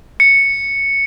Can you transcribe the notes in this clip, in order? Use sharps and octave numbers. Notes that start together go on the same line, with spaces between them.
C#7